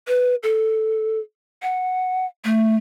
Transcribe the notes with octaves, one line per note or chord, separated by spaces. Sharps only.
B4
A4
F#5
A3